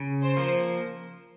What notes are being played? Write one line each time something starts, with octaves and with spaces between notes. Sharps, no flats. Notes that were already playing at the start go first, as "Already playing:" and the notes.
Already playing: C#3
C5
F3 A#3